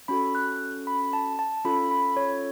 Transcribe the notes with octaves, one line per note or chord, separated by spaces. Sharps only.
C#4 F#4 A4 B5
F#6
B5
A5
A5
C#4 F4 A4 B5
B5
C#5